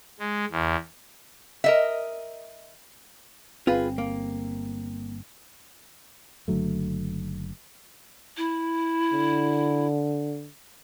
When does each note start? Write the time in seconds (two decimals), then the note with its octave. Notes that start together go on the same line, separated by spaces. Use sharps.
0.19 G#3
0.51 E2
1.64 A#4 D#5 E5
3.67 G1 C4 F4 G#4 B4
3.98 A#3
6.48 F#1 D3 F#3 A3
8.37 E4
9.13 D3